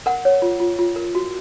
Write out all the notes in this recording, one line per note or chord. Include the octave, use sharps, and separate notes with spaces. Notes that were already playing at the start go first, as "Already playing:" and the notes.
A#4 F#5
C#5
F4
F4
F4
A#4
F#4